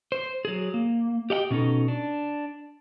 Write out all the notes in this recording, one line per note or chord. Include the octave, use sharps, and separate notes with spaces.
C5
F#3 G#4
A#3
G4 D#5 F#5 G5
B2 C#4 D#4 A4
D4